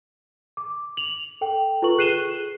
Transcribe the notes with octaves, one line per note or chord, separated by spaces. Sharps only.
D6
F7 F#7
A4 G5
F4 A4 B4 C#6 F#7
G#4 F#6 C7 D#7 E7 G7